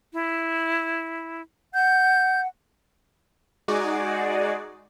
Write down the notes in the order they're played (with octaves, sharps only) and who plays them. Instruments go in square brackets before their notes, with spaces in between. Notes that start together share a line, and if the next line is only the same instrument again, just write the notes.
[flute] E4
[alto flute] F#5 [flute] G6
[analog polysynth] G#3 D#4 F#4 G#4 D5